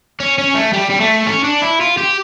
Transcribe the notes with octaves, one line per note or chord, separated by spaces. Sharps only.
C#4
C#4
A3
G3
G3
A3
C#4
D4
E4
F4
G4